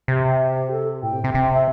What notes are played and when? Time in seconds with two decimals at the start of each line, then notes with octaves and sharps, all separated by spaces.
0.08 C3 G4
0.71 A4
1.03 A2 G5
1.13 C3
1.24 C3
1.35 C3
1.53 E5